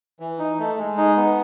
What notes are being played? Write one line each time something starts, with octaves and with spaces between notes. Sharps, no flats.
E3
D#4
A3
G#3
D#4
B3